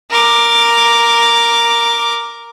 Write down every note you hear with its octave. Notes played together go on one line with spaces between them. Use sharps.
A#4 D6